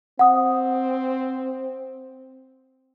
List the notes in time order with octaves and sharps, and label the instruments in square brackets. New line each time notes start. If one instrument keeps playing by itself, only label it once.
[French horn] C4 [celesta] F#5 D#6